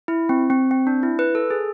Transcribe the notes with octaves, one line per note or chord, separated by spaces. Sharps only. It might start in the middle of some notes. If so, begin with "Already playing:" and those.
E4
C4
C4
C4
D4
E4
B4
A4
G#4